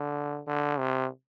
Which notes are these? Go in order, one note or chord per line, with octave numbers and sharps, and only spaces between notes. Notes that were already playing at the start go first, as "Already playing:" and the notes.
Already playing: D3
D3
C3